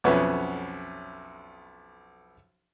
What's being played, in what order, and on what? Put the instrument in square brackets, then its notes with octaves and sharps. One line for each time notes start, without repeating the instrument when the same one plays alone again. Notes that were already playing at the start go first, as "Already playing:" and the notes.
[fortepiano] B1 F2 B3 C#4 E5